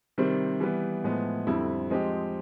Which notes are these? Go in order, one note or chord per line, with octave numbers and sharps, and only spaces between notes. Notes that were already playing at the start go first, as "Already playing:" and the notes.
C3 D#3 G3 C4
E3 G3 B3
A2 F3 G#3 B3
F2 D3 G3 C4 E4
F3 G#3 C4 D#4 G4